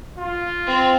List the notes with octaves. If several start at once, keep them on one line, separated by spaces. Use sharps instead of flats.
F4
C4